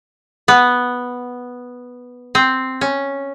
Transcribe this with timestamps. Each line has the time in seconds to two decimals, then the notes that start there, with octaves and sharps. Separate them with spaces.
0.48 B3
2.35 C4
2.81 C#4